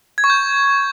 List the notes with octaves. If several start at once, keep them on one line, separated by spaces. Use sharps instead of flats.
G#6
C#6
G6